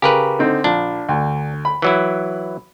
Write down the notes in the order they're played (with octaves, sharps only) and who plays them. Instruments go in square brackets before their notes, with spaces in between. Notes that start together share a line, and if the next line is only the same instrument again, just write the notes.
[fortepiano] C#3 [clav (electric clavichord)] G4 A#4 B4
[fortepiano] D3 C4 D#4
[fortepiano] A#1 [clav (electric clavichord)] D4
[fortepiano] D2
B5
[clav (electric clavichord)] E3 F#3 E4